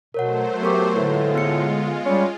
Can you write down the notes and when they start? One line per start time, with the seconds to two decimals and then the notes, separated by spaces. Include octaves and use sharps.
0.14 B2 F#3 A3 A#4 C5 C#5 F#5
0.62 B3 G4 A#4 C#6
0.95 A2 D3 G#3 F4 B4
1.35 B3 C#7
2.05 G3 C#4